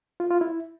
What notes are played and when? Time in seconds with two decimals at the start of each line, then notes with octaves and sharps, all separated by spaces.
0.20 F4
0.31 F4
0.41 E4